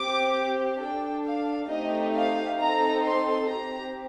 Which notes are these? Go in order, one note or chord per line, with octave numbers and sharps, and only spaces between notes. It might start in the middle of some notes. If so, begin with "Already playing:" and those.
Already playing: C4 G4 D6
D4 A4 G5
F5
A3 C4 D#4 G4 D#5
F5
C4 D#4 A4 A#5
C6
C4 G4 A#5